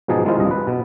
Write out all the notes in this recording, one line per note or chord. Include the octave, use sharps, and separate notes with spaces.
G#2 B2 F3 D#4 G#4 A5
D#3 G#3 E4 F4 C5
C2 G2 D#5
B4
B2